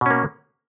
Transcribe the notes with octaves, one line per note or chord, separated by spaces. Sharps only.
B2 A#3 C#4